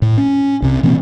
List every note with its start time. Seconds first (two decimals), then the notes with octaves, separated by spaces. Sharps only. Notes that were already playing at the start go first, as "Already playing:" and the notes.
0.02 A2
0.18 C#4
0.62 C2 C3
0.83 B2 E3 A#3 C4